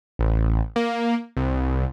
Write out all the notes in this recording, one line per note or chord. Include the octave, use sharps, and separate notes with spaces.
A1
A#3
C2